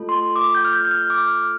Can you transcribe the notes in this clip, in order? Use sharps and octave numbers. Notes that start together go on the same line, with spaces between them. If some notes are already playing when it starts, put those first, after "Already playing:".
Already playing: A3 F4 A4
C6
D6
G6
F6
G6
G6
F6
D6
F6